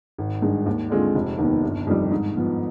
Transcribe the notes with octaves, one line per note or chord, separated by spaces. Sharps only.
G#1
G2 D#3 G#3
D#2
D3 G#3 C4 F4
F1
D#2 D#3 B3
G1
F2 D#3 G3
G#2
F3 B3